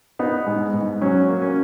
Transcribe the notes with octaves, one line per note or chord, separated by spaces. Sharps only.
B3 D#4
G#2
G#2
F#3 C#4
A#3
C#4